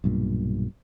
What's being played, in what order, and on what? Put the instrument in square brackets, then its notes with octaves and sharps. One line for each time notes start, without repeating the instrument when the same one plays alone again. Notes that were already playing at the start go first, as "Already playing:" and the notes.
[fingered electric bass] B1 G2 A#2